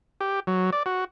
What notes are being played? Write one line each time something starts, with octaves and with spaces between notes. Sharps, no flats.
G4
F#3
D5
F#4